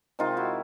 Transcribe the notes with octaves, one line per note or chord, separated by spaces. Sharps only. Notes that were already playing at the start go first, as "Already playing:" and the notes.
C3 D#3 G#3 D#4 F4
E4 F#4